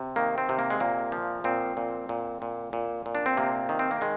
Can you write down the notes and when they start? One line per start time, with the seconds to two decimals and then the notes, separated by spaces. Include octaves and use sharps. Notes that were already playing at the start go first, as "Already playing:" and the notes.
Already playing: C3
0.16 D#3 A#3
0.38 C4
0.49 C3
0.59 A#3
0.70 G#3
0.80 A#2 A#3
1.12 F3
1.44 A#2 C4
1.77 A#2
2.09 A#2
2.42 A#2
2.73 A#2
3.06 A#2
3.15 D4
3.26 C4
3.37 C3 A#3
3.69 D#3
3.79 C4
3.91 A#3
4.01 D#3 G#3